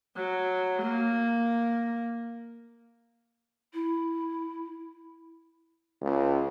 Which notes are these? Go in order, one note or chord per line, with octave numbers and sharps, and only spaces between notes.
F#3
A#3
E4
C#2